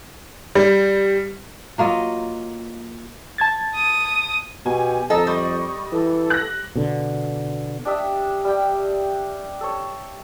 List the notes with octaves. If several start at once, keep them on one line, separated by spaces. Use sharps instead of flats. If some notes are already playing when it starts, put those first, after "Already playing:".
G3
F#3 A#3 F4 D#5
A5 G#6 A6
D#6
B2 G4 G#5
F2 A4 D#5 A#5
G3 C#6
E3 A4
F#6 A#6
B2 D3
D4 G4 D#5 E5
G3 G5
A4 C#5